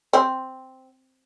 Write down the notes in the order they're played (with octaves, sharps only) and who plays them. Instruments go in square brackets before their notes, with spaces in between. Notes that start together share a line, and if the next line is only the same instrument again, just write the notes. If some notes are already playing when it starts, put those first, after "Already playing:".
[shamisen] C4